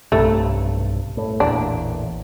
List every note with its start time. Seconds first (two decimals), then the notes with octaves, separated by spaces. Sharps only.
0.12 B1 G2 C3 A3
1.17 A2
1.40 A1 E2 A#2 D4